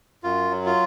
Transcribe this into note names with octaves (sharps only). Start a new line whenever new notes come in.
F#2 F4
F#3
F4